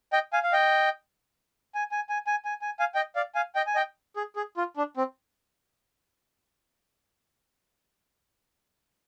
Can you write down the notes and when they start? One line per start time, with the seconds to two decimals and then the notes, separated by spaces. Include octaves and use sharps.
0.13 D#5 G5
0.33 F5 G#5
0.43 F5
0.53 D#5 G5
1.75 G#5
1.91 G#5
2.09 G#5
2.27 G#5
2.45 G#5
2.61 G#5
2.79 F5 G#5
2.95 D#5 G5
3.15 D5 F5
3.35 F5 G#5
3.55 D#5 G5
3.67 G#5
3.75 D#5 G5
4.16 G#4
4.36 G#4
4.57 F4
4.77 D4
4.97 C4